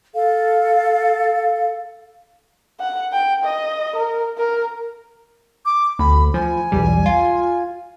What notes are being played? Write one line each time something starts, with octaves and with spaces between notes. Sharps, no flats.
A4 F5
F#5
G5
D#5
A#4
A#4
D6
D2 B5
F3 G#5
B1 E2 G3
F4